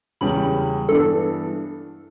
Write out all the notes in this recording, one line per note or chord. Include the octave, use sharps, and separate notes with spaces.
E2 C#3 G3 C#4 G4 B5
G2 E3 B3 D4 A4